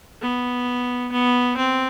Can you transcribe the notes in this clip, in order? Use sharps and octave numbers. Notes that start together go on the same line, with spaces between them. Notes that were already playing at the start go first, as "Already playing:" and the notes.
B3
B3
C4